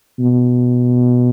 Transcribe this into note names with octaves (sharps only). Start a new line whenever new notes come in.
B2